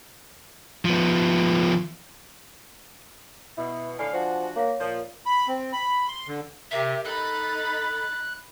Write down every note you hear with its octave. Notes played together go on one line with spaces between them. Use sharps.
F3 B3
B2 E4
A2 D3 D5 F5 G#5
F3 D4 F#4
A#3 C#5 F5
A#2 F3
B5
C4
B5
C6
D3
C3 G4 A#4 E5
D#4 A4 B5 F#6 A6